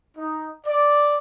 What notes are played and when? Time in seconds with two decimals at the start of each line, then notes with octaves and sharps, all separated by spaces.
0.16 D#4
0.66 D5